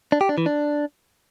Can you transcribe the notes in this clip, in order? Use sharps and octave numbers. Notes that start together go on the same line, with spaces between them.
D4
G4
D4
E3
D4